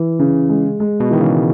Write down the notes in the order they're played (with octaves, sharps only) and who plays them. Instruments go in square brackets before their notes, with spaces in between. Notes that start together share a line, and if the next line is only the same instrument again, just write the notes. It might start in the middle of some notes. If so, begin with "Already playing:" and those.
Already playing: [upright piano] E3
C#3
G#3
G#3
[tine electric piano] B2
[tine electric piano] D#3 [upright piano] E3
[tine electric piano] C#3